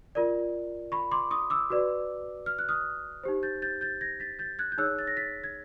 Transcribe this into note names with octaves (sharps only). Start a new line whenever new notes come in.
F4 A#4 D5
B5 C#6
C6 D6
C#6 D#6
D6 E6
F#4 B4 D5
F6
F#6
D#6 F6
D#4 G4 C5
G6 A6
G6 A6
G6 A6
G#6 A#6
A6 B6
G6 A6
F#6 G#6
G6
D#4 G#4 C#5 E6 F#6
A6
A#6
A6 B6
G#6